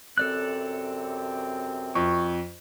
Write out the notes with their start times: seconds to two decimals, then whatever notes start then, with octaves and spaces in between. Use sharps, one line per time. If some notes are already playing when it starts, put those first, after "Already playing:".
0.18 F#2 C3 C4 A4 D5 F#6
1.95 F2 C#6